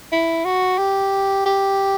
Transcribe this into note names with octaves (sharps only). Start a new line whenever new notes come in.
E4
F#4
G4
G4